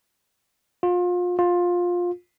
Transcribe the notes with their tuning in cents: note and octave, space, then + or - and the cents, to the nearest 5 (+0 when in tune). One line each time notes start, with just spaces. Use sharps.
F4 +30
F4 +15